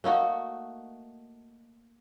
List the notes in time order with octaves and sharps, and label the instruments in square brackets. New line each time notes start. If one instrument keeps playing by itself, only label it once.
[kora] A3 A#3 D#4 F#4